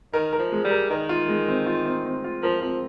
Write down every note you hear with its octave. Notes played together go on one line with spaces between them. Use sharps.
D#3 A#4
A#4
F3
G#3
G3
A#4
D#3 A#4
F4
G#3
C4
F4
C4
C4
F4
F3 A#4
F3 C4